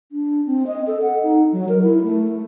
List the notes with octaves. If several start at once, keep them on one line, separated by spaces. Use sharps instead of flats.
D4
C4
D#5
A4
F#5
D#4
F#3
A#4
E4
A3